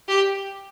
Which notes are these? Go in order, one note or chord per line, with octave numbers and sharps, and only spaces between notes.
G4